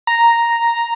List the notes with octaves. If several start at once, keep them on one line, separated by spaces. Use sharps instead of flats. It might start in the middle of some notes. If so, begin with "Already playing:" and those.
A#5